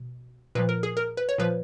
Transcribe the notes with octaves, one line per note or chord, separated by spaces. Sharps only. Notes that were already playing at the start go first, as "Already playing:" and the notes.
Already playing: B2
A#2 F3 B4
A#4
G#4
A#4
B4
C#5
A#2 F3 B4